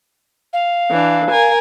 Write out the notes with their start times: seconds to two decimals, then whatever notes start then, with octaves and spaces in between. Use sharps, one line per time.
0.53 F5
0.90 E3 D4
1.30 A#4 G#5